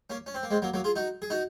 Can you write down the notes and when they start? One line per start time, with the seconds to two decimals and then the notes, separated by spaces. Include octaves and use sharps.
0.10 A#3 C#4
0.26 C#4
0.34 C4
0.43 A#3
0.51 G#3 C4
0.62 F#3 A#3
0.74 F#3 A#3
0.84 F4 G#4
0.96 D#4 F#4
1.22 G#4
1.30 D#4 F#4